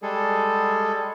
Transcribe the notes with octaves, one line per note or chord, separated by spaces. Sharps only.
G3 G#3 G#4 A4